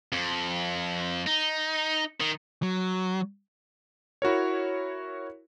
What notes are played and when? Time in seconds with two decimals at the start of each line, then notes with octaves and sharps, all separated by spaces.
0.13 F2
1.27 D#4
2.21 D#3
2.62 F#3
4.22 E4 F#4 A#4 C#5